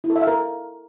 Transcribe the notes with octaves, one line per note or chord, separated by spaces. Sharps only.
E4
A4
E5
F5
A#4